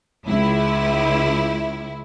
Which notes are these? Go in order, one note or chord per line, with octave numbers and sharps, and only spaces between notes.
C#2 E4